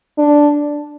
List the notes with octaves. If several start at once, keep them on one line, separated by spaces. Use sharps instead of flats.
D4